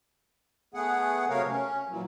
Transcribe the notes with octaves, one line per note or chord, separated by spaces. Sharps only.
A3 B3 G#4 F#5
C3 F#3 A3 A#4 C#5 F5
C#4
A#2 E3 F#3